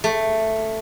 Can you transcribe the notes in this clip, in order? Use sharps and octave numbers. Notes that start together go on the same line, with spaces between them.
A3